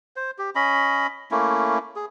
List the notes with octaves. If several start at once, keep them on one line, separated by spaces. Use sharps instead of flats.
C5
G4
C#4 D#5 B5
A3 A#3 C#4 E4
G#4